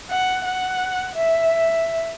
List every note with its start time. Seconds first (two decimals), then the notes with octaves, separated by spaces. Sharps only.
0.10 F#5
0.45 F#5
1.15 E5